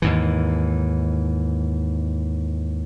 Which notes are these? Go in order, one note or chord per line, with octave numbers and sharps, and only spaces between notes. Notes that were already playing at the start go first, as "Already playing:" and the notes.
D#2 G#2 E3